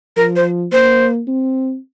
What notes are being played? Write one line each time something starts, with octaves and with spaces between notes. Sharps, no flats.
F3 A#4
C5
A#3 C5
C4